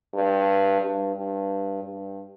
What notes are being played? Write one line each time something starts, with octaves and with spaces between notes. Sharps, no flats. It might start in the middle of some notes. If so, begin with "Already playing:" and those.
G2
G2
G2
G2